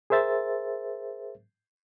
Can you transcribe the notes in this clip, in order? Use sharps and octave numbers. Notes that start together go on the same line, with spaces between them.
G#4 A#4 C5 E5 A6